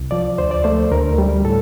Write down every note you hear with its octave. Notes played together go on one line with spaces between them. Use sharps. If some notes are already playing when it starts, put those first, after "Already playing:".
Already playing: C2
F3 D5
D2 C5
D5
A3 C5
D2 A#4
G3
A2 A4